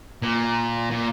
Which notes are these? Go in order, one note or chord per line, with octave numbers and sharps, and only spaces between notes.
A#2
A#2